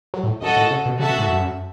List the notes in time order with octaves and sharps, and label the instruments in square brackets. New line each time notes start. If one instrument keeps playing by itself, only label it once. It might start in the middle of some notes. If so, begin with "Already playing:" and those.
[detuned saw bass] F#3
A2
[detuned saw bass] F#2 [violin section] F#4 A4 D#5
[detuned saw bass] A2
C#3
B2
[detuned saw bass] C#3 [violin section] F#4 A4 E5 A5
[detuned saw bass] B2
G#2
F#2